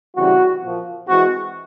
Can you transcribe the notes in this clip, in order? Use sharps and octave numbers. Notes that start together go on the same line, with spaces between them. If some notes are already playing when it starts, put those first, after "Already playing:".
C#3 E3 G3 C4 F#4
A#2 F3 A#3
E3 G#3 C4 F#4